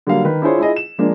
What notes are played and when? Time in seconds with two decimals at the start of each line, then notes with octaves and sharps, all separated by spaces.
0.07 D3 F#3 G3 A#3 F5
0.25 D#3 B4
0.42 D4 E4 F4 G#4 C5 C#5
0.58 E4 F4 G#4 D#5
0.76 E7
0.98 F3 G#3 A#3 D4